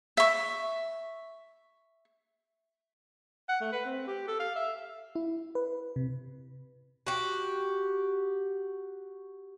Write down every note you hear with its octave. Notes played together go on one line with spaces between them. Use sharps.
E5 C#6
F#5
A3
B4
C4
G4
A4
F5
E5
E4
B4
C3
F#4 G4